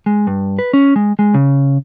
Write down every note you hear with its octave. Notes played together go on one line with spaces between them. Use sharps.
G#3
G2
B4
C#4
G#3
G#3
C#3